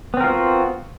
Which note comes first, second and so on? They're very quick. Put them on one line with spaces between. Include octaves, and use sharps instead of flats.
B3 C4 A#4 F4 F#4